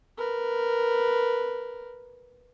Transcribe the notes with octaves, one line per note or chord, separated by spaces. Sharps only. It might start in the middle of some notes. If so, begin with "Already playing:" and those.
A#4 B4